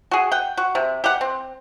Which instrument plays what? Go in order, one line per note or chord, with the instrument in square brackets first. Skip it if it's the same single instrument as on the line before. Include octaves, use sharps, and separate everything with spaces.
[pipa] F#4 G#4
F#5 G5
F#4
C3
G4 F#5
C4